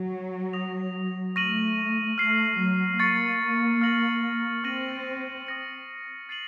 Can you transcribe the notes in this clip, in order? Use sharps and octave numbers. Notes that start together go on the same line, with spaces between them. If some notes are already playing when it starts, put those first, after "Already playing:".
Already playing: F#3
D#6 A#6 F7
A3 C#6 F6 A#6 D#7 F#7
A3 F6 C7 F#7
F#3
A#3 C#6 A6 C#7
F6 A#6 C#7 F#7
C4 C#6 F6 A#6 D#7 F#7
D#6 A#6 C#7
A6 C7 D#7 F#7